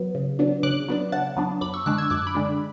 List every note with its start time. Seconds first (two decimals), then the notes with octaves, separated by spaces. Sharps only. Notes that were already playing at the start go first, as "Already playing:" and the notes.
Already playing: F#3 B3
0.15 C#3
0.39 F#3 B3 D4
0.63 C#3 D6 F#6
0.88 F#3 B3 D4
1.12 C#3 F#5 A5
1.37 F#3 B3 D4
1.61 F#2 B5 D6
1.74 C#6 E6
1.86 D3 G#3 D4 D6 F#6
1.98 E6 G#6
2.10 F#2 D6 F#6
2.27 B5 D6
2.35 D3 G#3 D4